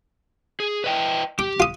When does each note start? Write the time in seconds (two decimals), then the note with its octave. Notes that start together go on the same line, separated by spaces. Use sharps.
0.60 G#4
0.84 B4 D#5 G5
1.39 G4 D6
1.60 F4 D#6